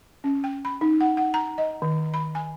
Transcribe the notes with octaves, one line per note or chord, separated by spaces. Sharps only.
C#4
G5
B5
D#4
F#5
F#5
A#5
D#5
D#3
B5
G#5